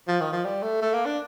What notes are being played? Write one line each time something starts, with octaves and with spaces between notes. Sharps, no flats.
F3
D#3
F3
G3
A3
A3
A#3
D4